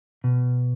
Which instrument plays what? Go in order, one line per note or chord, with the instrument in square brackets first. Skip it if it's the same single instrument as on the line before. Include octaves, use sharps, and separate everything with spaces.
[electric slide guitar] B2